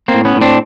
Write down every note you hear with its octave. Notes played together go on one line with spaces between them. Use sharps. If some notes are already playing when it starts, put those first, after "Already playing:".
A#3 C4
A2
B3 C#4
A2
C4 D4